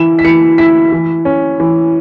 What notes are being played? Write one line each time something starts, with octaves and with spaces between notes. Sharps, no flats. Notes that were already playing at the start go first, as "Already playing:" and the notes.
Already playing: E3 E4 E7
B6
E3 C#7
E4 B6
E3
C#4
E3